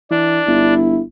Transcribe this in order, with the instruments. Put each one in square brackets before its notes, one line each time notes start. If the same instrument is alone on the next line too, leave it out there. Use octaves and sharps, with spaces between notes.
[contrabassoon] E3 [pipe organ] D4
[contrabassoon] G1 [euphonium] E4